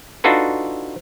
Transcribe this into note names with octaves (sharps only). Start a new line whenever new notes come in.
D4 D#4 F4 F#4 A4 B4